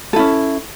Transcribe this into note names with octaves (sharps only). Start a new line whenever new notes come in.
C#4 E4 A4